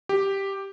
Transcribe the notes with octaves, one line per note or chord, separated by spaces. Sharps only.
G4